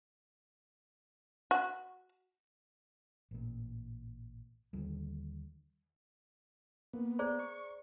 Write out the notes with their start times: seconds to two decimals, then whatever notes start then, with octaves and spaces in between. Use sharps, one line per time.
1.51 F#4
3.31 A1 A#2
4.73 D#2 D3 D#3 G3
6.93 A#3 B3
7.19 G#4 C5 D5 A#5
7.39 C#6